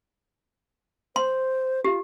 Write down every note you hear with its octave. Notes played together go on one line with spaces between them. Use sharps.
C5 C6
F4 G4